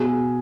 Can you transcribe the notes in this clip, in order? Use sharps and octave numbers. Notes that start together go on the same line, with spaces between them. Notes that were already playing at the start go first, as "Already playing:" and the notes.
Already playing: B2 G#4